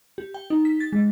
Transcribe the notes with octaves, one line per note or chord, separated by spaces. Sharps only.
G4
G5
D#4
B6
A6
G#3